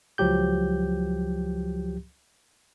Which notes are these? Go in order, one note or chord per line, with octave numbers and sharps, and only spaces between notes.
C#2 F3 F#3 G4 G6